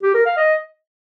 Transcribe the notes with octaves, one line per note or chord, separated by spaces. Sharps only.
G4
A#4
F5
D#5